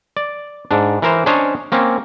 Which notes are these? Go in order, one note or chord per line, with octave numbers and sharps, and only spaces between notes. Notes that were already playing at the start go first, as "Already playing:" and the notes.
D5
G#2 D4
E3 A#4 C5
C#4 D4 C5 C#5 D#5 A#5
A#3 C4 C#4